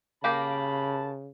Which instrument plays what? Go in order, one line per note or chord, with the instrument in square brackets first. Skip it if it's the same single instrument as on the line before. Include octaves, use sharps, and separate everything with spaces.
[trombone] C#3 [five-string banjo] A#3 G4 A#4 [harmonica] A5 B5